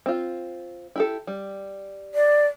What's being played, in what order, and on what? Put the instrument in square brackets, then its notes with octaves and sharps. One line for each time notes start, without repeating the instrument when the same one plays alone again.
[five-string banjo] C4 F4
E4 G4 A4
G3
[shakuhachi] D5